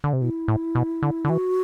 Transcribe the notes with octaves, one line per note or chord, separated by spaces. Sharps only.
D3
C3
B2 E4
A2
B2
D3
D3
E3 F#4